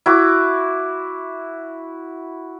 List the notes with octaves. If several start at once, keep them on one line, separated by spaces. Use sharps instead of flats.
E4 F#4 D6